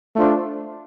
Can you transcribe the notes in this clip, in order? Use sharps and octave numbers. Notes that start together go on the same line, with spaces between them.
A3 D4 F4 C5